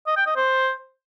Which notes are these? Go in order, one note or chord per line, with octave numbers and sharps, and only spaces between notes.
D#5
G5
D#5
C5